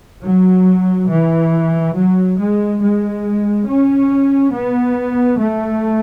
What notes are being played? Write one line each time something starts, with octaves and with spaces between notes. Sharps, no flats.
F#3
E3
F#3
G#3
G#3
C#4
B3
A3